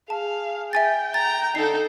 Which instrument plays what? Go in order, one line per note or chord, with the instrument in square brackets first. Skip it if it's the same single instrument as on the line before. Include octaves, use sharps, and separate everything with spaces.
[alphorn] G#4 [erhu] F5 [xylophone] A5
[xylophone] E5 G#5 A6 [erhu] G5
[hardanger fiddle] A#5 [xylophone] A6
[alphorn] D3 [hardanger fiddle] D#4 A4 [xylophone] C7